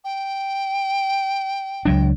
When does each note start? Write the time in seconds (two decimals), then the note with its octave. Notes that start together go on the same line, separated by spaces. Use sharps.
0.04 G5
1.85 C#2 F#3 D4